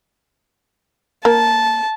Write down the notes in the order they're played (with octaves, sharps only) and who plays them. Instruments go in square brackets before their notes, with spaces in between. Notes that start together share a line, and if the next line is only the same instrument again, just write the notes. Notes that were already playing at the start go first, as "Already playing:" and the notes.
[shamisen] A#3 [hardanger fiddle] A5